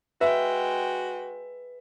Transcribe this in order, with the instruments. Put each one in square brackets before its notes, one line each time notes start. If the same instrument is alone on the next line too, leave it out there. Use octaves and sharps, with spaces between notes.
[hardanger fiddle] G#3 G5 [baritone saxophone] F#4 [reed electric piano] B4 [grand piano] E5